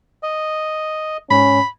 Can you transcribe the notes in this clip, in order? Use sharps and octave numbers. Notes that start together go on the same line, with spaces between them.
D#5
G#2 C#4 B5